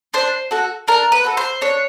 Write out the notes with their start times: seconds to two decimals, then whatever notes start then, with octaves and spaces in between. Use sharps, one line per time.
0.14 D4 C5
0.51 F#4 A4
0.88 D4 A#4
1.12 B4
1.24 F#4 A4
1.37 C5
1.61 D4 C#5